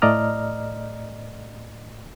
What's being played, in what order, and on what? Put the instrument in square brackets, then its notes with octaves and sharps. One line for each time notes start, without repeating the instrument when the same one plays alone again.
[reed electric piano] A2 A3 D5 D#5 A#5 F6